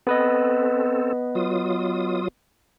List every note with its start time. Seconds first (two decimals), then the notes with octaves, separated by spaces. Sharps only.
0.07 B3 C4 A4 B4 D#5
1.35 F#3 F4 D#6